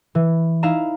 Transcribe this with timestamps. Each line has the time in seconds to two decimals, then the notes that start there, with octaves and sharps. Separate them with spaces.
0.15 E3
0.63 D#4 E4 F5 A#5 E7